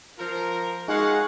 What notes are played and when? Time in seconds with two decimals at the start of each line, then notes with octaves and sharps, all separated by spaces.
0.19 F3 F4 A#4
0.88 G#3 D#4 F#4 G#4 F5 F#5 C#6